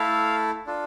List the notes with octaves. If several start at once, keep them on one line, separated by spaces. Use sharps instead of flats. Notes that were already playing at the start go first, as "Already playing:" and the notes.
Already playing: A3 E4 A4 F5
D4 F4 A4